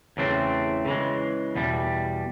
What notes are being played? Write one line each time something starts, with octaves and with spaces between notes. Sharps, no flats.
E2 C#3 E3 A3 C4
C#3 E3 G#3
E2 B2 G3